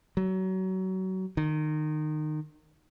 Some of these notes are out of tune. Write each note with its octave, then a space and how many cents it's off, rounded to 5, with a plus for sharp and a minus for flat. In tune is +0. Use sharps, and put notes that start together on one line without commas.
F#3 +25
D#3 -25